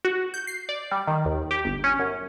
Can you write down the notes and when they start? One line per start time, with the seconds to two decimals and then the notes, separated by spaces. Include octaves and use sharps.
0.05 F#4
0.34 G6
0.47 C7
0.69 D5
0.91 G3
1.07 D#3
1.25 D#2
1.51 G4
1.65 G1
1.84 C#4
1.99 F#2